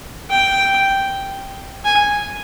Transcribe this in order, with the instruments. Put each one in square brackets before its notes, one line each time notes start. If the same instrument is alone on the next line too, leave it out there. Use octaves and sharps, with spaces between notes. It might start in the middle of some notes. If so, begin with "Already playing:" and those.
[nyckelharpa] G5
G#5